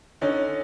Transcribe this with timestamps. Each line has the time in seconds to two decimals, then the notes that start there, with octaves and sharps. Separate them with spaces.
0.21 D3 C#4 D#4